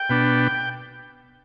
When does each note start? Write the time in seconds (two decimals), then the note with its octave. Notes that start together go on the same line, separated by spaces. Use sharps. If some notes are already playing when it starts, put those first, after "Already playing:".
Already playing: G5
0.10 B2 B3 D4